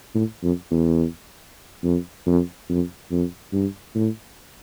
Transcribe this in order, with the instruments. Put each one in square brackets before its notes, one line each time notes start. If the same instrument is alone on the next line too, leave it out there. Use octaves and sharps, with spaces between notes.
[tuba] A2
F2
E2
F2
F2
F2
F2
G2
A2